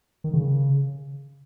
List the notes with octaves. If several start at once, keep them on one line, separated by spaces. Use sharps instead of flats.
D#3
C#3